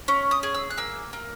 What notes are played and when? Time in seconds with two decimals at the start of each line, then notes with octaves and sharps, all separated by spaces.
0.08 C#4
0.31 D#6
0.43 G#4
0.55 E6
0.71 F#6
0.78 A#3 E6
1.13 A#3